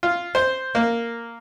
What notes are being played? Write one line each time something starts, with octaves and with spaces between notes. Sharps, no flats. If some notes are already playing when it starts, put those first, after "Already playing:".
F4
C5
A#3